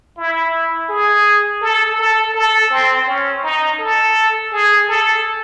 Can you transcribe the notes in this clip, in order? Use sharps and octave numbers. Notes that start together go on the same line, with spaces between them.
E4
G#4
A4
A4
A4
C4
C#4
D#4
A4
G#4
A4